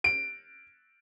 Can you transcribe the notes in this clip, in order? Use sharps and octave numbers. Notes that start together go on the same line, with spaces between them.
D7